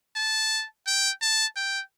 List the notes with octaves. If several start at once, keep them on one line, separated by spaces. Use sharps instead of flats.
A5
G5
A5
G5